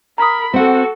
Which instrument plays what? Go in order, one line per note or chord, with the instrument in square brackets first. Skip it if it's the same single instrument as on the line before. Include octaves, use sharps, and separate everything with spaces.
[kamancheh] A#4 B5 [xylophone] A#5 D#6
[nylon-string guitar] C4 F#5 [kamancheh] F#4 A4